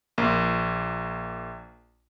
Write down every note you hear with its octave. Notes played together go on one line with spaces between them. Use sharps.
A#1 A#3